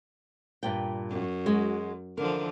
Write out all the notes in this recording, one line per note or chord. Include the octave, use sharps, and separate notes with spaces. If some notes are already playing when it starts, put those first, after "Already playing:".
G2 A#2 G5
F#2
G#3 F#4
D3 E3 F3 A#4